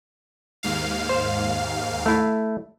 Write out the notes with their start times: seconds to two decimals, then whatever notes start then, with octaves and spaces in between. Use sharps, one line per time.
0.63 D#2 G#2 F5
1.09 C5
2.06 A3 E4